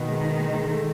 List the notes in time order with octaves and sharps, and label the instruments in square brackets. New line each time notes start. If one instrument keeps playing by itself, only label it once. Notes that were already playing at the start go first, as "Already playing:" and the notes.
Already playing: [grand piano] B2 B3 [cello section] D#3
[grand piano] G#3
D#4
G#3
G#3
A3